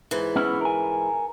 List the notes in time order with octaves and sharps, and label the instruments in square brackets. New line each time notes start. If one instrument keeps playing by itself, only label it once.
[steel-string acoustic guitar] G#2 E3
[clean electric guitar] B3 C#4 E4
A#4 G#5